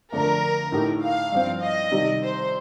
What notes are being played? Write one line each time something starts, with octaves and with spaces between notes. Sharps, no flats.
F2 D3 A3 D4 A#4
A2 A3 D#4 G4
F5
G2 F3 C4
D#5
C3 D#3 G3
C5